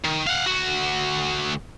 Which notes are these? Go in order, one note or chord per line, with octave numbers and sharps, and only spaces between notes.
D#3
F5 F#5
D2 F#4